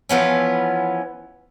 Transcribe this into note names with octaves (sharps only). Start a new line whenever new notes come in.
E3 F3 B3 C#4